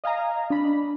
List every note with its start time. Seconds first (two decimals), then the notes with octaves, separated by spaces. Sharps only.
0.04 D#5 F5 G#5 A#5
0.50 D4 B5